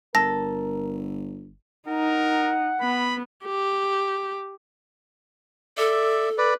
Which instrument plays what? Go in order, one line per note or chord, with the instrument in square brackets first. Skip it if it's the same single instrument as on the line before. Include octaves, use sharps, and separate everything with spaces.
[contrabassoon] G1 [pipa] A4 [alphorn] A#4 [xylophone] A#6
[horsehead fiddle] D#4 [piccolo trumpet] A#4 [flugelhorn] F#5
[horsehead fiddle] B3 [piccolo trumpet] B5
[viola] G4
[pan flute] A4 [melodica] D5 E5
[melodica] B4 D5